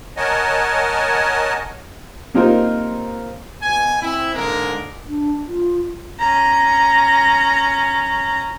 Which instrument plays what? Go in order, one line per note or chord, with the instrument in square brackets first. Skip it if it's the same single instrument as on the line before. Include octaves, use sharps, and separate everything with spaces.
[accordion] A#4 C#5 D#5 F#5 G#5 A5
[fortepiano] C3 A#3 D#4 F4 A#4 C5
[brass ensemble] B2 G#5
C4 E4
G#2 D3 G#3 A#3 A#4
[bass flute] D4
F4
[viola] C#4 A#5